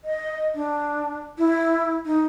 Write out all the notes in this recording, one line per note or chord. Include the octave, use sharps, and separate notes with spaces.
D#5
D4
E4
D#4